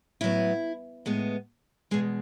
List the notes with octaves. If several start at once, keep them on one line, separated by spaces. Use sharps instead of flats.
A2 F#3 B3 E4
A2 G#3 B3
E2 B2 G#3 G#4